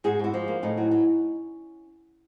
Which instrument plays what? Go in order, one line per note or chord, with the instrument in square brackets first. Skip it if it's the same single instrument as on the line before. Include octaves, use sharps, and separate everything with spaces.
[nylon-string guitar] G#2 F#4 G#4
G#2 E4 F#4
F3
A#3
A2 C#4 D#4
F#3
F#3